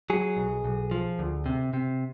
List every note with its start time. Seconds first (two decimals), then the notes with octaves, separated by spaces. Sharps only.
0.10 F#3 G#4
0.37 B1
0.64 B1
0.91 F3
1.19 D2
1.46 C3
1.74 C3